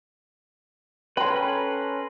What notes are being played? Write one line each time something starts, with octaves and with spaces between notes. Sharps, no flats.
C#4 A4 B4 G5 A#5 C6